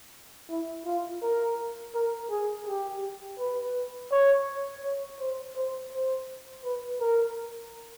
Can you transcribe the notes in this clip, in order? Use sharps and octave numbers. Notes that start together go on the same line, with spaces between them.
E4
F4
A#4
A#4
G#4
G4
B4
C#5
C#5
C5
C5
C5
B4
A#4